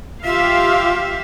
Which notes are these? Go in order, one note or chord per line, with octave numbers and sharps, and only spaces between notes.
F4 G4 E5 F5